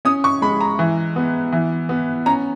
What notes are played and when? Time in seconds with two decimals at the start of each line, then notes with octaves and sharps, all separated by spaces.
0.05 C#4 D#6
0.24 C#6
0.42 G#3 B5
0.61 A#5
0.79 E3
1.16 B3
1.52 E3
1.89 B3
2.26 C#4 A#5